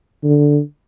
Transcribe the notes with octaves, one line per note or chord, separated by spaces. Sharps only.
D3